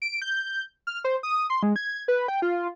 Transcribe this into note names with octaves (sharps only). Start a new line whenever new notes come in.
D7
G6
F6
C5
D#6
C6
G#3
G#6
B4
G5
F4